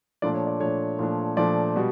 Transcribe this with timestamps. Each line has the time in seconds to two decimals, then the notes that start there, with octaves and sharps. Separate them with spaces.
0.22 A#2 F3 A3 D4 D5
0.34 C#5
0.47 D5
0.60 A#2 F3 A3 D4 C#5
0.99 A#2 F3 A3 D4
1.37 A#2 F3 A3 D4 D5
1.76 B2 G3